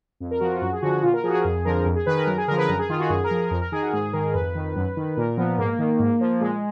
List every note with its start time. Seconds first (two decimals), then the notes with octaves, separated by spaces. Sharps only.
0.20 F2
0.31 A#4
0.40 F3 F#4
0.51 F4
0.61 F#2 F#4
0.73 G#4
0.82 D3 F3 F#4
0.93 F#4
1.03 A#2 F4
1.13 A#4
1.24 F3 G#4
1.29 F#4
1.34 G#4
1.45 F2 G#4
1.65 D3 F3 A#4
1.86 F2
1.96 G#4
2.06 D#3 B4
2.17 A#4
2.27 F#2 A#4
2.38 G#4
2.48 D3 F3 A#4
2.58 B4
2.69 F#2 A#4
2.79 G#4
2.89 D#3 F4
3.00 F#4
3.10 F#2 G#4
3.24 A#4
3.31 F3
3.37 G#4
3.51 F2 A#4
3.62 A#4
3.72 D#3 G#4
3.82 F#4
3.93 G#2 G#4
4.13 D#3 A#4
4.34 F2 B4
4.55 D#3
4.76 F#2
4.97 D#3
5.17 A#2 A#4
5.37 F3 B3
5.58 G#2 A#3
5.79 D#3
5.99 G#2
6.20 F3
6.41 A#2 G#3